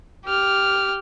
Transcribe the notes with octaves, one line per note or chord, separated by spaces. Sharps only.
G4 F6